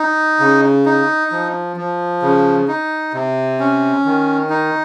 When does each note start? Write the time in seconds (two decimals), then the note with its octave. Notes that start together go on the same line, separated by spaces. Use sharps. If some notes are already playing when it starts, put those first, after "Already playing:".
Already playing: D#4
0.40 C#3
0.86 D#4
1.32 F3
1.76 F3
2.22 C#3
2.68 D#4
3.14 C3
3.60 C#4
4.05 D#3
4.50 D#4